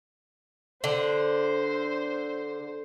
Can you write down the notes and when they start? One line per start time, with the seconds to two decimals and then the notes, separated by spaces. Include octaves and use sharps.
0.84 D3 C5